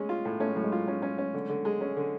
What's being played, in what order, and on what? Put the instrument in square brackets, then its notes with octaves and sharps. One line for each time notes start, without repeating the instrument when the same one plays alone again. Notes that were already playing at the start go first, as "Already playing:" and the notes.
Already playing: [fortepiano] G#3 C#4 [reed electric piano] A3
[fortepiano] F4
A2
[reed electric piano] A3 [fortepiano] C#4
[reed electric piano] G#3
[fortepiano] A2 [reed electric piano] F#3
[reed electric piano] G#3
[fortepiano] F4
C#4
C#4
C#4
D3
D3
G#3
C#4
D3